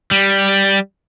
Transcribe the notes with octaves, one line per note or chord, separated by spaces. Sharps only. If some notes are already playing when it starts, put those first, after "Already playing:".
G3